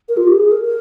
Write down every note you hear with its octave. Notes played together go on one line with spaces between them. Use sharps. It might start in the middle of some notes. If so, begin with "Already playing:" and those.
A#4
F4
G4
G#4
A#4
A#4